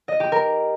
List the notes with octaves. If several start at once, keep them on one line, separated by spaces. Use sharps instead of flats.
D#5
G4
A#4